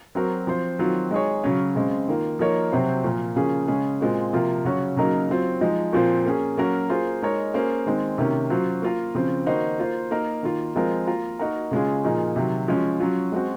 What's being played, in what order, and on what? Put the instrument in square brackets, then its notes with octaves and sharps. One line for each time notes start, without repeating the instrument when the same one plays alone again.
[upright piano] F#3 C4 F#4 A#4
F3 C4 F4 C5
D#3 F#3 C4 F4
G#3 D#4 G#4 C#5
C#3 F#3 C#4
C#3 G#3 C4
D#3 A#3 F4
F3 A#3 D#4 A#4 C#5
C3 F#3 C4 F#4 C5
A#2 F3 A#3
C#3 F3 A#3 C#4 G#4
C#3 G#3 C#4 G#4
A#2 G#3 C4 F4
C3 F3 A#3 F4
C#3 F#3 C#4 F#4 C#5
C#3 F#3 A#3 D#4 A#4
F#3 C4 F4
F3 G#3 D#4
A#2 F3 C4 F4
A#3 C#4 G#4
F#3 A#3 C#4 F#4 A#4
A#3 F4 G#4 C5
G#3 D#4 A#4 C#5
A#3 C#4 G#4 C5
D#3 G#3 C4
C3 D#3 A#3 C#4
F#3 C#4 F4 C5
A#3 F4 A#4
C#3 F3 C4
D#3 A#3 D#4 F#4 C5
A#3 F4 C5
A#3 D#4 A#4
D#3 A#3 F4
F3 G#3 C4 F4 A#4
A#3 F4 A#4
A#3 D#4 F#4 A#4
C#3 G#3 C#4 F4 G#4
A#2 F3 A#3 D#4 G#4
C3 D#3 F#3
F3 G#3 C#4
F#3 C#4 F4
G#3 C4 F#4